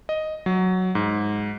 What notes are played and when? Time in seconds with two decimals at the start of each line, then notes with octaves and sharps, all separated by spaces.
0.09 D#5
0.46 F#3
0.95 G#2